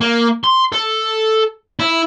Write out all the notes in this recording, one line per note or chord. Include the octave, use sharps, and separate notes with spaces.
A#3
C6
A4
E4